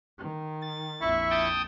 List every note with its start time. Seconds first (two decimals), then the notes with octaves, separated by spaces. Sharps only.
0.18 D#3
0.62 A6
1.01 A#1 F2 E4 E5 B5 C#6
1.31 G5 A5 D#6